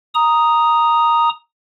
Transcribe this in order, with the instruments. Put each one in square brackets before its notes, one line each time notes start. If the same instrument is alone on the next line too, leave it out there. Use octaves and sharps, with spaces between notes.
[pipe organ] A#5 D#6